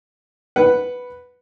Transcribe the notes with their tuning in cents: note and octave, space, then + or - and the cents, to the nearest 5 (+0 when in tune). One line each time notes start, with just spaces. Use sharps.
B4 +0 F#5 +0